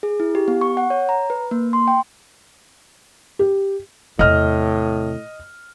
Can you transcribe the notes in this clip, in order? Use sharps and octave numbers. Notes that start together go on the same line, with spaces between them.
G#4
E4
G4
B3
C#6
F#5
C#5
A#5
B4
A#3
C6
G5
G4
E2 A2 C3 D#5 F6